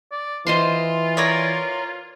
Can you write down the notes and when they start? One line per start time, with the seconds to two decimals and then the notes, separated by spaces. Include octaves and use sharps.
0.11 D5
0.47 E3 F4 C5 D#5 C6
1.17 A#4 C#5 D5